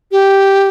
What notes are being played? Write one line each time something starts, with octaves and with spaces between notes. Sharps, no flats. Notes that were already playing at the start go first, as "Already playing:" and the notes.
G4